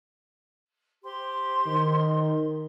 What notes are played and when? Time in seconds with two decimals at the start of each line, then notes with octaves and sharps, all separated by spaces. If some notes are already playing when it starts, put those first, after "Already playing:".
1.03 G4 C5 C6
1.66 D#3